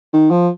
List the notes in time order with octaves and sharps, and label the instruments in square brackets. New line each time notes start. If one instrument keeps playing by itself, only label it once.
[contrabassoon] D#3
F3